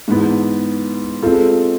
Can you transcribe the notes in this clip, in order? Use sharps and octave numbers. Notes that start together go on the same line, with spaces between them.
G#2 E3 B3
G#3 C4 F4 A4